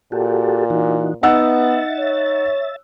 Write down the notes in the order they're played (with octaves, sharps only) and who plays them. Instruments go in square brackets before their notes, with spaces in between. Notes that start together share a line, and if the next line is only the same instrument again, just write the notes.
[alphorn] A#2 [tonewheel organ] F#4 G4 A4
[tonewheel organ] E3 D#4 F#4
[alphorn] B3 [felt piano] D#4 F#5 E6 [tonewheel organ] E5 A6
[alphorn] C#5